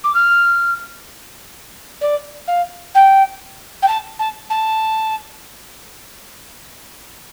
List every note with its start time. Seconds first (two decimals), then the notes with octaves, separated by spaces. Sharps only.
0.04 D6
0.14 F6
2.01 D5
2.47 F5
2.94 G5
3.82 G5
3.87 A5
4.19 A5
4.50 A5